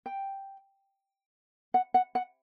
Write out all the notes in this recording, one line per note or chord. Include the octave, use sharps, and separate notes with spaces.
G5
F#5
F#5
F#5